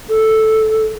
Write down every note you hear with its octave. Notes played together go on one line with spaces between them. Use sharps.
A4